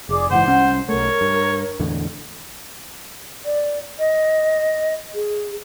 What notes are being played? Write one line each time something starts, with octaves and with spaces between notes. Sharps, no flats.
F1 G#4 D5 D6
F#1 G#2 E3 C5 F#5
C2 C#4
B1 A3 A#4 C#5
G2
E2 A2 D3
D5
D#5
G#4